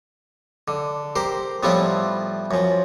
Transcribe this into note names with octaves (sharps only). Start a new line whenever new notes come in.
D3
G4 A#4 C5
A2 F3 G3 B3 E4 F4
F#2 F3